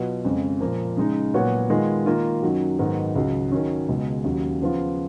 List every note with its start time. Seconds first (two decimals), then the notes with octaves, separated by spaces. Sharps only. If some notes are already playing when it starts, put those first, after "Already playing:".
Already playing: B2 F#3 B3 F4 B4
0.25 F2 C#3 G#3
0.60 A#2 F3 A#3
0.97 C#3 G#3 D#4
1.34 A#2 F#3 B3 F#4 C#5
1.70 D#3 G#3 B3 F4
2.06 D#3 A#3 F4
2.43 F#2 D#3 F#3
2.79 G#2 D#3 F#3 B3
3.15 C#2 C#3 F#3
3.52 D#3 F#3 C#4
3.89 C#2 B2 G#3
4.24 D#2 C#3 F#3
4.61 C#3 F3 B3 F4